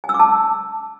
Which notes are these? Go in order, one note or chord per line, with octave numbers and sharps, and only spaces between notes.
G#5
E6
D6
A5